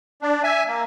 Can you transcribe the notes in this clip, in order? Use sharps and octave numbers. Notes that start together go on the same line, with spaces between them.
D4
E5 G#5
A#3